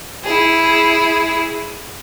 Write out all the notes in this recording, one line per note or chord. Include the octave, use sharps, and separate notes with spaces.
E4 G#4